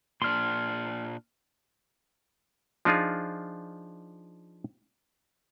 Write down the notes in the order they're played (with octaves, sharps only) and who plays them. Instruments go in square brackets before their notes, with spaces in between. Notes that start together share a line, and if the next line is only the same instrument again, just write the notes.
[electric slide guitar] A#2 D4 [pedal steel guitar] C6 F6
[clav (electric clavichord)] F3 D4 D#4 F4 G#4